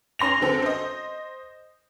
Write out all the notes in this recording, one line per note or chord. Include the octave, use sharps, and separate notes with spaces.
C#4 C6 A#6 F7
F#2 D3 C4 A4
C5 D#5